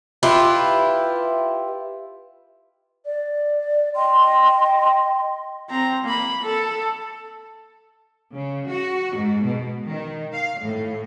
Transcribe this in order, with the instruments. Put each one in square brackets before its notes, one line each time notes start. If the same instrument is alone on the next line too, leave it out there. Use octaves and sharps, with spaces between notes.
[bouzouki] E4 F4 G4 B4
[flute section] D5
[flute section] D#5 G5 [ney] C6
[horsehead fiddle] C4 A#5
A#3 B5
A4
[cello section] C#3
F#4
G#2
B2
D#3
F5
A2